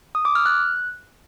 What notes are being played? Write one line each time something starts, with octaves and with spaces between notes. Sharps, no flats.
D#6
D6
F6
F#6